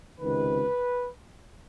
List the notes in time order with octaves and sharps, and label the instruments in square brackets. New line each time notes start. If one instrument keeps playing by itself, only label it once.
[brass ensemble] C#2 C3 D#3 B4